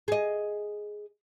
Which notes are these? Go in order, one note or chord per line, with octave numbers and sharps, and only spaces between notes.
G#4 D#5